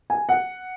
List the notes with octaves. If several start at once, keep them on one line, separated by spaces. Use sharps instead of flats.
G#5
F#5